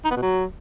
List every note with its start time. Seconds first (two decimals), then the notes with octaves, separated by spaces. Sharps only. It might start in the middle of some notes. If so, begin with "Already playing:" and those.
0.05 D#4
0.11 B3
0.17 B2
0.22 F#3